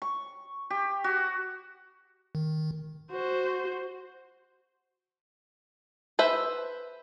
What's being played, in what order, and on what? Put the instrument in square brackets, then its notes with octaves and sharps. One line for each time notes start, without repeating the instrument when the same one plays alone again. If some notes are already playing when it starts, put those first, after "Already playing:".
[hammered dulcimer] C#6
G4
F#4
[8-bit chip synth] D#3
[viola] F#4 C5
[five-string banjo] B4 C5 E5